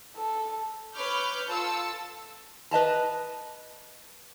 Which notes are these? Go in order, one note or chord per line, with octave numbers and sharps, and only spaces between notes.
A4
B4 C#5 B5 D6 F6 G6
F4 A4 A5 E6
B4 D#5 A5 A#5